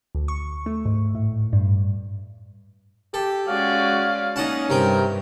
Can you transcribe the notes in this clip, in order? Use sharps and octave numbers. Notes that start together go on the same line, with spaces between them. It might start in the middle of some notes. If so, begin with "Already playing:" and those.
D2
C#6
A3
G#2
A2
G2
G4 A4
G#3 C#4 F#4 D5 F5
A#3 C#4 D#4 D#5 F#5 A5
G2 C3 A#4 G5